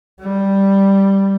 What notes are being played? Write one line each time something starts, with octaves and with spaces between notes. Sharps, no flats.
G3